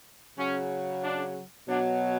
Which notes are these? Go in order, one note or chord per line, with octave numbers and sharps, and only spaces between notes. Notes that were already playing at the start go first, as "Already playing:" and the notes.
C#3 F#3 C#4
D4
B2 F#3 D4